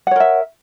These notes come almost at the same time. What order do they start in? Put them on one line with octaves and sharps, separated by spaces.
F#5 C#5 A#4 E5